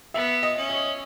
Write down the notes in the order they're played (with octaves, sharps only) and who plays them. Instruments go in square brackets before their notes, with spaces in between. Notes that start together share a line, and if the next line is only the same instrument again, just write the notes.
[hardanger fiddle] B3 [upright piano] E5
[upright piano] D#5
[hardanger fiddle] C#4
[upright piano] C#5